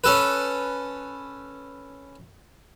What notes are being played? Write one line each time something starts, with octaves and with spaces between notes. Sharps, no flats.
C#4 A4 B4